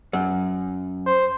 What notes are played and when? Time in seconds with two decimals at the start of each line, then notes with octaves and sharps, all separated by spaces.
0.13 F#2
1.06 C5